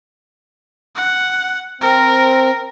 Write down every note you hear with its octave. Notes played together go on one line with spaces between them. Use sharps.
F#5
C4 A#4